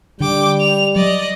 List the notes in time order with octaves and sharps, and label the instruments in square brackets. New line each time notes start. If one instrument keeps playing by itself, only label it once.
[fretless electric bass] D3 [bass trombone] G3 [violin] G5 D6
[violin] F7
[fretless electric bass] F#3 [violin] D5 D#5